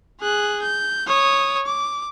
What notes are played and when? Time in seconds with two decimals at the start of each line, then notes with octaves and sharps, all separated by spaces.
0.20 G#4 F#6
0.62 G6
1.07 C#5 D#6
1.66 D6